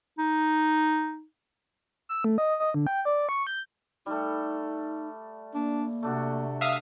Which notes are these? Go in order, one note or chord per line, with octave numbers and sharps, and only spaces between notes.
D#4
E6
A3
D#5
D#5
D3
G5
D5
C#6
G6
G3 A3 D#4
A#3 D4
C3 A3 D4 F#4
E5 F5 D#6